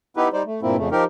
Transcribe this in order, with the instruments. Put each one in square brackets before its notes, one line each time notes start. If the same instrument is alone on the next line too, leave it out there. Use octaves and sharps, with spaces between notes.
[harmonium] B3 D#4 E4 G4 B4
G3 D#4 C5 D5
A3
G2 A#2 F3 A#3 C4 E4
F2 C#3 A3
F3 D#4 G4 A#4